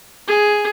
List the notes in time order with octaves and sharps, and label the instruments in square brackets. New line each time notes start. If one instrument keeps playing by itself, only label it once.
[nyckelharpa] G#4